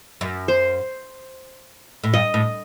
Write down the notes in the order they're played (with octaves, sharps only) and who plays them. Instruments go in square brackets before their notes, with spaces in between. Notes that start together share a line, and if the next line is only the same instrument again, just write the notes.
[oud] F#2
[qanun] C5
[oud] A2
[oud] G2 [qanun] D#5
[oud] A2